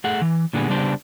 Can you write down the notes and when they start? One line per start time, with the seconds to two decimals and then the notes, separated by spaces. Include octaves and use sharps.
0.04 A3 G#4 F#5
0.22 E3
0.53 A#2 D3 G3 B3 G#4
0.69 C#3 G3 B3 D4 G4 C5